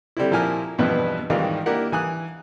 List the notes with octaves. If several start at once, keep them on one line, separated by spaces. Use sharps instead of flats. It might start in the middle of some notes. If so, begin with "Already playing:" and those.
D3 G3 C4 E4
A#2 F3 A#3 E4 G#5 F6
E2 G2 B2 F3 D4 B4
G#2 D#3 E3 G3 F4 G4
A#3 D4 E4 G4 A#4 F#5
E3 G#5 D#6 F#6